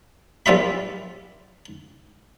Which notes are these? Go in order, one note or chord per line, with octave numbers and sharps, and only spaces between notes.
A#1 G3 F4 E5 B5